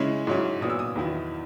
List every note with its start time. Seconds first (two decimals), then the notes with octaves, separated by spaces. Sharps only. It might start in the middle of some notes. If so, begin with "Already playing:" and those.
Already playing: C#3 G#3 C#4 E4
0.27 G#2 F#3 C#4 E4
0.61 A#2 F#3 B3 D#6
0.70 E6
0.79 D#6
0.95 E2 D#3 F#3 B3 E4